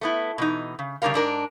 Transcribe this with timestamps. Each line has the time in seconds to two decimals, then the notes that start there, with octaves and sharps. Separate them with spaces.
0.01 A3 B3 E4
0.38 B2 E3 D#4
0.79 C#3
1.02 C#3 G3 C#4 D4 A#4 F5
1.14 G#2 D4 A#4